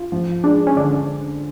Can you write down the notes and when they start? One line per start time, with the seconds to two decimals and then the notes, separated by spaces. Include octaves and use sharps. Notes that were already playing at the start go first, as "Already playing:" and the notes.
Already playing: F4
0.12 F3
0.44 G#3 D4
0.67 C#4
0.76 D3 D4